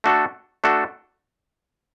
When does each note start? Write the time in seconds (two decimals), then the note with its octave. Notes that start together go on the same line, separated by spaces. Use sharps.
0.04 A3 D4 F#4 A4
0.64 A3 D4 F#4 A4